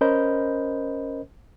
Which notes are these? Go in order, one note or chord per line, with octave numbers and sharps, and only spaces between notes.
C#4 A#4 C5 D#5 B5 G6